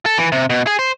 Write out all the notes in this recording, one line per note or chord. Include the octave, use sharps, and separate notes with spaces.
A4
E3
C3
B2
G#4
C5